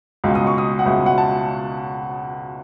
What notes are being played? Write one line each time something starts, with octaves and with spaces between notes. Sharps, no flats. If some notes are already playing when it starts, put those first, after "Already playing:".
C#2 B2 G#3
D#6
C#6
D#6
F#5
C#2 B2 G#3 E5
F#5
A5